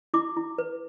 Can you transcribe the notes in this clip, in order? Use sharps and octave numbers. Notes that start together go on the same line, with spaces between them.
E4 D6
E4
B4